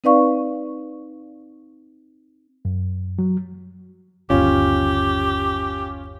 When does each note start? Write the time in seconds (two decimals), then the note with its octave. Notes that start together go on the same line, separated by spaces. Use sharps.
0.04 C4 D#4 B4 D5 F5 C#6
2.65 F#2
3.19 F#3
4.30 G1 D#2 C#4 F4 G4